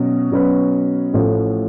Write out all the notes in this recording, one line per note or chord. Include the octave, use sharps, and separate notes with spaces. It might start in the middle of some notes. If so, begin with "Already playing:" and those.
Already playing: B2 F#3 C#4 F#4
B2 F#3 C#4 F#4 B4
A1 A2 F3 A3